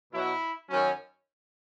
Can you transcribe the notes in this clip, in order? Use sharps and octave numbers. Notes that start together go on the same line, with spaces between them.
B2 F#3 E4
F#2 D#3 F#3 C#4